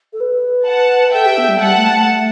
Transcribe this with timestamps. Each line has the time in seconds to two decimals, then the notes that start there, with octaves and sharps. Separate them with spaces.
0.12 A4
0.20 B4
0.67 F#5 A5
1.13 A4 E5 G5
1.25 G4
1.37 B3
1.48 G3
1.60 G3 F#5 A5
1.76 A3
1.91 A3